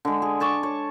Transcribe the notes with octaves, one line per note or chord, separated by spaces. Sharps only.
D3 G#3
G#4
D5 A5 C#6 D6
C#5